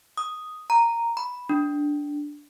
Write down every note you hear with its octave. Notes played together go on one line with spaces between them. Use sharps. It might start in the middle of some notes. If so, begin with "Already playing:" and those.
D#6
A#5
B5
D4